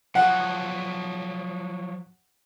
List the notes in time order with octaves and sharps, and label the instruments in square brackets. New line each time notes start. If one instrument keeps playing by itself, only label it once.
[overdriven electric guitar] F3 F#3 [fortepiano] F#5